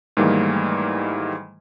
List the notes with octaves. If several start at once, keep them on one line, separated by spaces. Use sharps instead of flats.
G#2 D#3 E3 G3 A3 A#3